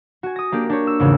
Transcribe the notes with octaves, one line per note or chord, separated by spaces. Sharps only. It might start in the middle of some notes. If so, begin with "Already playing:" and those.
F#4 G#5
D#6 A#6
A#3 D4 G4
D4 G4 C#5
E6
G#1 E2 C#3 G#3